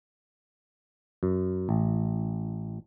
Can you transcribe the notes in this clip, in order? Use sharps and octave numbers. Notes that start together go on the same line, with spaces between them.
F#2
A1